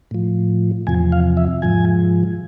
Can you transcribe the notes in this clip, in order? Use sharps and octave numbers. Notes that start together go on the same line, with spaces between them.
A2 F3
E2 C3 F3 G#5
F5
E5
G#2 F3 G#5